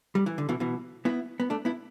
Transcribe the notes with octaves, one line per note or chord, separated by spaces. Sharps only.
G3
E3
D3
B2 E3
B2 E3
B3 E4
B3
A3 D4
B3 E4